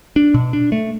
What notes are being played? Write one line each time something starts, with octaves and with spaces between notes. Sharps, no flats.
D4
B2
D4
A3